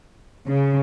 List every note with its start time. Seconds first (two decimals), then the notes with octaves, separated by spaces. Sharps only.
0.46 C#3